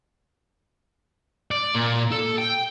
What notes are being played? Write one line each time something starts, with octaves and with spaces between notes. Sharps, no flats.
D5
A#2
A4
G5